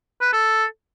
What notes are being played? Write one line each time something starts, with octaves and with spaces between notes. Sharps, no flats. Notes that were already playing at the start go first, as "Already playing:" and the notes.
B4
A4